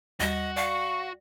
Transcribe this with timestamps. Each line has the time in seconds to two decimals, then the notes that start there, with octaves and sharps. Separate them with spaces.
0.20 D#2 G3 F#4 D#5
0.56 D5 F5 C#6